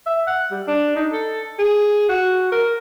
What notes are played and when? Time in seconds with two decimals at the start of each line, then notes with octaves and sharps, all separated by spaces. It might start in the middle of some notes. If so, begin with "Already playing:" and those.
0.06 E5
0.27 F#5
0.51 G3
0.67 D4
0.96 D#4
1.12 A4
1.59 G#4
2.09 F#4
2.52 A#4